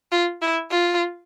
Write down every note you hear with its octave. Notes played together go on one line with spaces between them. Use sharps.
F4
E4
F4